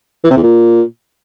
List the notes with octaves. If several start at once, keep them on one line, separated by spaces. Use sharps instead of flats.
E3
C3
E2
A#2